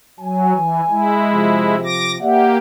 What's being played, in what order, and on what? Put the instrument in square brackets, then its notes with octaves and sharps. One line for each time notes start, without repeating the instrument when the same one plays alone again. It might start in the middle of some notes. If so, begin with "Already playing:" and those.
[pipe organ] F#3 [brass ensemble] G#5
[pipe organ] E3
G#3 E4
[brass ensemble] C3 F3
[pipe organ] D6 A#6
[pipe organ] A#3 G4 [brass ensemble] D5 E5 F#5